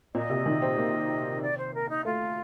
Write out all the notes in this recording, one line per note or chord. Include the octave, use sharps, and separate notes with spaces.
A#2 D#5
C3
D#3
C4
A#3
D5
C5
A#4
D#4
A3 F4